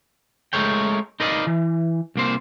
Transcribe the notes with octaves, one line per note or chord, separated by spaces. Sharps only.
G#3 A3 A#4 C#5 G5
D#4 A#4 B4 D5 D#5 F5
E3
C2 A#3 C5